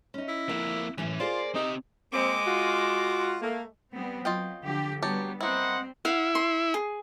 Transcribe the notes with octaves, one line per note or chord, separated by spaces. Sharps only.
C#4 D#4
E4
F2 A#3 F#5
F#2 A2 E3 C#4
A#3 F4 G#4 C5 D5
C4 D#4 G4
G#3 A#3 C4 D6
F4 F#4
A3 A#3
G3 B3 C4
F#3 F4 D#5 G5
D3 F3 G4
F#3 G3 B3 G4 A5
G3 A#3 C4 E4 C5 D#5 F#5
E4 F5 F#5
C6
G#4